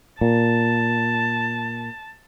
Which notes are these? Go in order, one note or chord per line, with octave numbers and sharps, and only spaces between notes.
A#2 A5